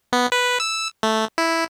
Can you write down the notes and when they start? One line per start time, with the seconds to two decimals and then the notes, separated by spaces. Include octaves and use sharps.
0.13 B3
0.32 B4
0.60 E6
1.03 A3
1.38 E4